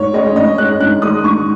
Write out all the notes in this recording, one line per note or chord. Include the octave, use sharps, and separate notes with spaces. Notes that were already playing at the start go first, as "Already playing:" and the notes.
Already playing: G#2 C#5
G#3 C#4 D#5
G#2 D#5
G#3 C#4 F#6
G#2 F#6
D#3 G#3 D#4 D#6
G#2 C#6